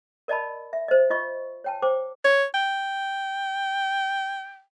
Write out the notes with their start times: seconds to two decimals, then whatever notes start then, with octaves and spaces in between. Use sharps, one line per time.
0.28 A#4 D5 D#5 A5 B5
0.73 E5
0.88 C5 D#5
1.10 F4 D#5 C#6
1.64 C#5 G5 A5
1.82 C5 G5 D6
2.24 C#5
2.54 G5